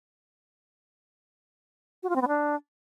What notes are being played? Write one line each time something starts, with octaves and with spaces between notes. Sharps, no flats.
F#4
F4
C4
B3
D4